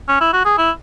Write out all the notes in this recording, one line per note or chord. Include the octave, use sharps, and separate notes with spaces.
C#4
E4
F#4
G#4
E4